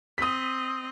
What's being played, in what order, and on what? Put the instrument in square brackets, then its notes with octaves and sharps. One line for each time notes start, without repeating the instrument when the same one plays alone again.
[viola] C4 D#5 [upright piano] D#6 B6